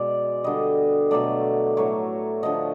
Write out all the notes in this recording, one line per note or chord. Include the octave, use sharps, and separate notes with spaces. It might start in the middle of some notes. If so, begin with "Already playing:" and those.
Already playing: B2 G#3 D5
D3 G3 D#5
B2 F#3 A3 D5
A2 F#3 A3 C#5
D3 F3 A3 D#5